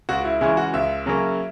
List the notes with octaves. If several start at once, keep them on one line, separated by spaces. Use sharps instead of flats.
C#2 F#4
E4
C#3 E3 G#3 C#4 E4
F#4
C#2 E5
C#3 F#3 A#3 C#4